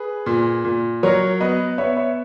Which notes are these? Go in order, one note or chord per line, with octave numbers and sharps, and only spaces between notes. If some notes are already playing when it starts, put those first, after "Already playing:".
Already playing: G#4 B4
A#2
A#2
F#3 A#4 C#5
B3 B4 D#5
B3 C#5 E5
C#5 E5